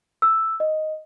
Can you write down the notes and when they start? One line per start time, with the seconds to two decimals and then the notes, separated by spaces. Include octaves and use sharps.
0.22 E6
0.60 D#5